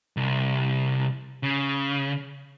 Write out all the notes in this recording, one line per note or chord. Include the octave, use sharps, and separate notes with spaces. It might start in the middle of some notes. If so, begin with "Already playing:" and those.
C2
C#3